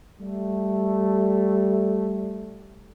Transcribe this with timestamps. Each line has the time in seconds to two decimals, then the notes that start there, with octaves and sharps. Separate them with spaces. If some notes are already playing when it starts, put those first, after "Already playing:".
0.21 G3 A3